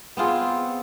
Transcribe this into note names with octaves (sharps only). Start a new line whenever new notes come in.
B3 C4 F4 G#4